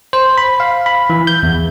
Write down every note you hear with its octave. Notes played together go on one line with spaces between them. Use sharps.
C5
B5
F5
B5
E3
G6
E2